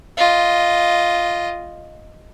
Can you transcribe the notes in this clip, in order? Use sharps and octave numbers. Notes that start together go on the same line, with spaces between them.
F4 D#5